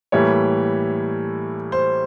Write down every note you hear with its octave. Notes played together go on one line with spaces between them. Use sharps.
A2 E3 G3 A#3 C#5
C5